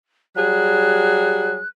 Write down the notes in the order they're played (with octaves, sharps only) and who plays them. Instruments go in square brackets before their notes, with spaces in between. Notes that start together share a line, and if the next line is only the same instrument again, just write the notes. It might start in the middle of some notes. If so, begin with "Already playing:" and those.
[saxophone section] F#3 G3 G#4 [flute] F#6